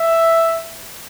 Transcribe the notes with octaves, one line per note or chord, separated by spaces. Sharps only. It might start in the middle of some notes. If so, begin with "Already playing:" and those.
Already playing: E5